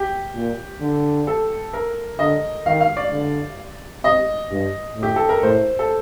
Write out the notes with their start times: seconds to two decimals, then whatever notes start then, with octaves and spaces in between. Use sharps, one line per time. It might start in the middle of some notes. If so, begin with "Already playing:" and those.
Already playing: G4
0.35 A#2
0.80 D3
1.27 A4
1.73 A#4
2.19 D3 D#5
2.66 D#3 F5
2.81 F5
2.97 D5
3.12 D3
4.04 C3 D#5
4.51 G2
4.96 A2
5.03 G4
5.16 A4
5.29 A#4
5.43 A2 C5
5.79 A4